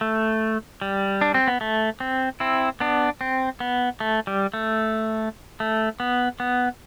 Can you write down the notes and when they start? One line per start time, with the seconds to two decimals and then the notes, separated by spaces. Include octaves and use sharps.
0.01 A3
0.81 G3
1.21 D4
1.34 C4
1.47 B3
1.61 A3
2.00 C4
2.40 C4 E4
2.80 B3 D4
3.21 C4
3.60 B3
4.00 A3
4.27 G3
4.54 A3
5.60 A3
6.00 B3
6.40 B3